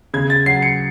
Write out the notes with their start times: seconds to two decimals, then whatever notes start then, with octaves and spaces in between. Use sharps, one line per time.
0.14 C#3 G#6
0.30 A6
0.46 F#3 C7
0.62 C#7